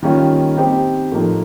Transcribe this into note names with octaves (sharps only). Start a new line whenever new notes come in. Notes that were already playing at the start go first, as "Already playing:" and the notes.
D#3 G3 A#3 C#4 F4
C4 D#4 G4 C5
A2 F3 A#3 D#4